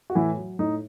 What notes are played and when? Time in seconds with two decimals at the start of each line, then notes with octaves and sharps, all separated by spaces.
0.10 F#4
0.15 A2 E3 E4
0.37 F#3
0.59 A2 D#4